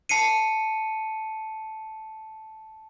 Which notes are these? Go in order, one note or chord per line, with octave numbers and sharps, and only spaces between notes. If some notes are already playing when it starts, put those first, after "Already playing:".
A5 C7 C#7 D#7